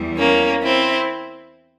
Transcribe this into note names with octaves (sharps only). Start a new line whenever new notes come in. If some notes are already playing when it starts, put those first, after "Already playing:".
Already playing: E2 E3 G3
A#3 C#4
C4 E4